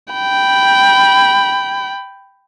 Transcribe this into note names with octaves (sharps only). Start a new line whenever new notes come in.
G5 B5